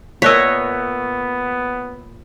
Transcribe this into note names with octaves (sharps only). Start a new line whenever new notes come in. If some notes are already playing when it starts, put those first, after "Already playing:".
A#2 A3 B3 C#5 D#5 E6 F#6 B6